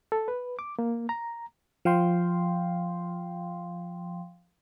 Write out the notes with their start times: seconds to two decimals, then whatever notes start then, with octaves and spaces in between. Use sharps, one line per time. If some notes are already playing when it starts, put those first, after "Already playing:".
0.12 A4
0.28 B4
0.59 D6
0.79 A#3
1.09 A#5
1.85 F3 F5 G5 C6